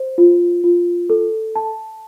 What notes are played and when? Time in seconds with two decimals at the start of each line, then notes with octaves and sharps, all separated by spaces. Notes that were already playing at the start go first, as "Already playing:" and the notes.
Already playing: C5
0.18 F4
0.64 F4
1.10 A4
1.55 A5